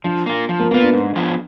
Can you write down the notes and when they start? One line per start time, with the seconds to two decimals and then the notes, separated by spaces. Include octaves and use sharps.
0.04 F3 D4
0.26 A#3 F4
0.49 F3
0.60 A#3
0.71 A#3 B3 F4
0.82 D4
0.93 G#2
1.16 F3 B3 F4 G#4